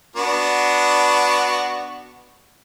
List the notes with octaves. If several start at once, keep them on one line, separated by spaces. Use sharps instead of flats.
B3 D4 F#4